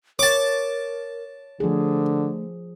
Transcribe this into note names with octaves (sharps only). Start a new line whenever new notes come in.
A#4 C#5 A5 D6
D3 F3 A3 G#4